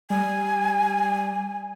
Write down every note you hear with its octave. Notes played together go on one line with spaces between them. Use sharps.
G3 G#5